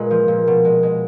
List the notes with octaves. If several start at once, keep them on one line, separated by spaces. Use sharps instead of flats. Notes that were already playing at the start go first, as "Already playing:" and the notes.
Already playing: A#2 G#3 B4
F3
A#2
B2
G#3
G#3